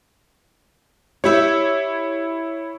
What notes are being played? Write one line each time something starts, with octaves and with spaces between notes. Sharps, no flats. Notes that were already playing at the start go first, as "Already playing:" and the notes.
E4 G4 C#5 E5